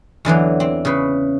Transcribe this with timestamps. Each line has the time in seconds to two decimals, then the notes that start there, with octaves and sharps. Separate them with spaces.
0.25 E2 D3 E3 F#3
0.60 C4
0.85 C#3 B4